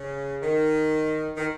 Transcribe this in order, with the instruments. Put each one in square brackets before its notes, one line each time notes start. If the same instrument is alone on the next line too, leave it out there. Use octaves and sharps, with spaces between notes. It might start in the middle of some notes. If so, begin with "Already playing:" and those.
Already playing: [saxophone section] C#3
D#3
D#3